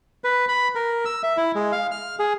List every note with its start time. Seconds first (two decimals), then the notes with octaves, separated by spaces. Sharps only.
0.24 B4
0.49 B5
0.75 A#4
1.05 E6
1.23 E5
1.37 E4
1.55 G#3
1.72 F5
1.91 F6
2.19 G#4